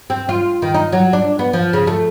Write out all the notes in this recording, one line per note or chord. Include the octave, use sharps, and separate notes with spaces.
C4
F4
D#3
D#4
F#3
D4
B3
F3
C#3
A3